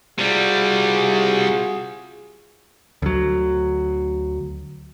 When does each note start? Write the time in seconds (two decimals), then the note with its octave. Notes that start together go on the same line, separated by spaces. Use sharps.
0.18 C3 G3 F4 F#4 G#4
3.02 D2 F#3